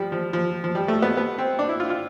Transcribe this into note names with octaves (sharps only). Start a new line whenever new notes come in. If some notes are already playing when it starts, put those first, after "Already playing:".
Already playing: F3 G3
F3
F3
F3
G3
A3
B3
B3
C4
D4
E4
F4
F4